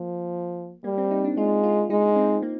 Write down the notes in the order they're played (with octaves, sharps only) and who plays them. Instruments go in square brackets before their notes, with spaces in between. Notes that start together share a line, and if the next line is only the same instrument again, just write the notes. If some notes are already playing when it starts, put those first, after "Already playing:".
Already playing: [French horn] F3 [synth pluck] A#3
[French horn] G3 [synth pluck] A#3
[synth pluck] C4
D#4
D4
[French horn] G#3 [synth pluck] F4
[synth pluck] F4
[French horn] G#3 [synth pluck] D#4
[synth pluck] C4
A#3